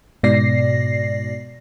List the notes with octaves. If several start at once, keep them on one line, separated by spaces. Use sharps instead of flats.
G#2 B2 D5 A#6 C7